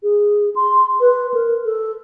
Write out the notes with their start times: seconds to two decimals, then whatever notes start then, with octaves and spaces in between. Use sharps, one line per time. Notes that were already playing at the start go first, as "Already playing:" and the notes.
0.03 G#4
0.56 C6
1.00 B4
1.34 A#4
1.65 A4